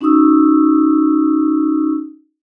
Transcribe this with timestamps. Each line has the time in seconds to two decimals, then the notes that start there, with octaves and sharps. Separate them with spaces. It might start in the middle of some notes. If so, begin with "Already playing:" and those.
0.01 C#4 D#4 F#4 C#6 D#6 E6